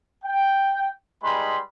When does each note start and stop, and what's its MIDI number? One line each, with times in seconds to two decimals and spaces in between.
0.24 0.88 79
1.23 1.58 55
1.23 1.58 56
1.23 1.58 63
1.23 1.58 71
1.23 1.58 83
1.23 1.58 84